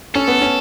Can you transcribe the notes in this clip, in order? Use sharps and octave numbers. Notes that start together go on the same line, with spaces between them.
C#4 A4
B3
C#4